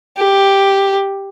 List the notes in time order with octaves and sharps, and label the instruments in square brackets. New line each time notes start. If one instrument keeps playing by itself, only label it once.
[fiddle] G4